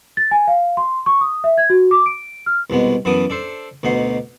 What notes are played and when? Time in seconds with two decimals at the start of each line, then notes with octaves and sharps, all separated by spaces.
0.17 A6
0.31 G#5
0.48 F5
0.77 C6
1.06 C#6
1.21 D#6
1.44 E5
1.58 G#6
1.70 F#4
1.91 D6
2.06 D7
2.46 F6
2.70 C2 B2 G#3 B3
3.05 F#2 E3 B3 A5 D6 D#6
3.30 D4 A4 C5
3.83 D2 B2 D#4 F#5 C6